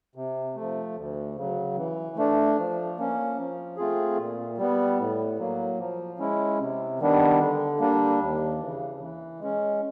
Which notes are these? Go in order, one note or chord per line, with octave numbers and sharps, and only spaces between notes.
C3
A3
F3
D2
C#3 F#3
E3
A3 D4
F3
A#3 C#4
F3
A3 C4 F4 G#4
A#2
G3 B3
A2
F#3 A#3
F3
G#3 C#4 E4
C3
D#3 G3 B3 D4
D3
G3 A#3 D4
D#2
C#3 E3
E3
G#3 C#4